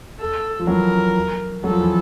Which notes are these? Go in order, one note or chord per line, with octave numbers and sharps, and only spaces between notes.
A4
F3
E3 F#3 A#4
F#3 A4
F3
E3